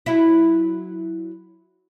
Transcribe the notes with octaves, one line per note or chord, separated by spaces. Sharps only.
F#3 E4